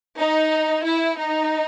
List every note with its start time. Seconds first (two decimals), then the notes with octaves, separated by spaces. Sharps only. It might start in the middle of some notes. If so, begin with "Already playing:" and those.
0.19 D#4
0.85 E4
1.19 D#4